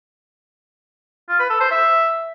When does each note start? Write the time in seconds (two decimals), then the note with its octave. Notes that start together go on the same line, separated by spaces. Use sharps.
1.29 F4
1.40 B4
1.50 A4
1.61 C5
1.71 E5